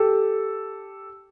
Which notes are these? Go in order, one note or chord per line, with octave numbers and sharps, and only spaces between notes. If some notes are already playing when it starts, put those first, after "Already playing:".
Already playing: G4 A4